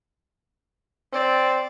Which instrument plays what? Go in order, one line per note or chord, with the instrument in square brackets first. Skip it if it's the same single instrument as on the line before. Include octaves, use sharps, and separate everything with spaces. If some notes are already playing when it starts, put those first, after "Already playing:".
[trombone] C4 [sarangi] D5